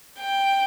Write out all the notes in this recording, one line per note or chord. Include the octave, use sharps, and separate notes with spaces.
G5